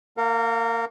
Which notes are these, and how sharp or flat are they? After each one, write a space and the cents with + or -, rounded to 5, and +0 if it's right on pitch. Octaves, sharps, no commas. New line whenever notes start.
A#3 -25 A#4 -25 F5 +35